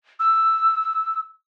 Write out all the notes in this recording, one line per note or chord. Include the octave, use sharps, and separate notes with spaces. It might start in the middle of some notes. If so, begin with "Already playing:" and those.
E6